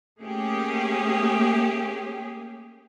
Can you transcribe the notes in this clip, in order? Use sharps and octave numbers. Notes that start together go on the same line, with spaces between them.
A3 A#3 C#4 G4 G#4